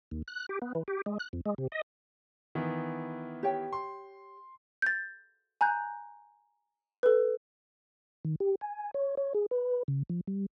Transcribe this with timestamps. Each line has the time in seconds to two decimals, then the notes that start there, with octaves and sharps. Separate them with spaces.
0.11 D#2
0.28 F#6
0.49 G4
0.62 B3
0.75 E3
0.88 G4
1.06 G#3
1.19 F#6
1.33 F2
1.46 G#3
1.58 C3
1.72 D#5
2.55 D#3 E3 B3
3.43 G4 C#5 G5
3.73 C6
4.82 G6 A6
5.61 G#5 A#5 F#6 G6
7.03 A4 B4
8.25 D#3
8.40 G4
8.61 G#5
8.94 C#5
9.17 C#5
9.34 G#4
9.51 B4
9.88 C#3
10.10 F3
10.27 G3